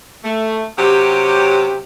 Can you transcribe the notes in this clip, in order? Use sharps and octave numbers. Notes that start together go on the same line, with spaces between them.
A3
C3 F#3 C#4 G4